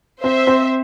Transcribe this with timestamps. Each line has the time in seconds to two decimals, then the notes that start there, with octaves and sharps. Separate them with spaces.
0.24 C4 C5 E5
0.47 C4